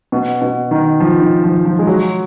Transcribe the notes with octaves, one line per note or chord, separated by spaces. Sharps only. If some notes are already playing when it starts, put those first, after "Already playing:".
B2
B2
D#3
F3
D#3
F3
F3
G#3
F#3